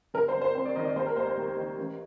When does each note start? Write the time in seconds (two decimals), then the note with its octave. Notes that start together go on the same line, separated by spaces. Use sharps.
0.14 G1 A#4
0.28 C5
0.35 G1
0.41 C5
0.55 F2 C5
0.65 D5
0.76 D#3 D#5
0.85 D5
0.96 D#2 C5
1.06 A#4
1.16 D#2 C5
1.27 C5
1.37 D#2
1.57 D#3
1.78 A1